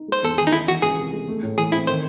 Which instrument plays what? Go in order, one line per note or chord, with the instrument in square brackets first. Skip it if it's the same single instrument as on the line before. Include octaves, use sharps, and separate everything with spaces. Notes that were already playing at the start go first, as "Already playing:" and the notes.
Already playing: [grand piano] D#4
[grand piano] G#3 [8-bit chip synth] C5
[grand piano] E2 [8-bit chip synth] A4
[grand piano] D#3 [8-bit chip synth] G#4
[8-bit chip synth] D#4
[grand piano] C#4 [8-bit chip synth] E4
[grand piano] E3 [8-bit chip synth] F#4
[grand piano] C#2 [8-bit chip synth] G#4
[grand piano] C3
G#3
A3
A2
[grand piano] E3 [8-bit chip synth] G#4
[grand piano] C4 [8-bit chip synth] E4
[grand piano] D#3 [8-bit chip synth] C5